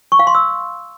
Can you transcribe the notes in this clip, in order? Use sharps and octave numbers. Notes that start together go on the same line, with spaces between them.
C#6
F5
C6
E6